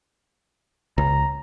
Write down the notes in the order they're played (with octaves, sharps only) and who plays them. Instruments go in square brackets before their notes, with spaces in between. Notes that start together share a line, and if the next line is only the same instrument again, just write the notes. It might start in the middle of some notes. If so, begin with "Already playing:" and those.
[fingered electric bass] C#2 [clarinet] A#5